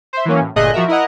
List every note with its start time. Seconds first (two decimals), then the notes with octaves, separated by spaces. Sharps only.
0.13 C5 E5
0.25 E3 F#3 A#3 C#4
0.41 A2
0.56 G1 A#2 A3 G#4 D#5 F#6
0.74 F3 F#4 A#4 E5
0.88 E4 A#4 D#5 F#5